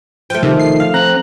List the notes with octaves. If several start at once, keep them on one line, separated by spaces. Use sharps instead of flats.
F3 A3 G5
C3 D#3
C7
F5
C4 A#5 F#6